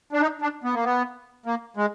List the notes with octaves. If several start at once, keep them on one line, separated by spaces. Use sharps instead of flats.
D4
D#4
D4
B3
A#3
B3
A#3
G#3